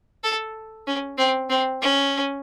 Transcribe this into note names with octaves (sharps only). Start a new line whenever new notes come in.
A4
C#4
C4
C4
C#4